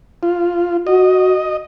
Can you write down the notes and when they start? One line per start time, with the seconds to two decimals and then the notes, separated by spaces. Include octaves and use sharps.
0.23 F4
0.87 F#4 D#5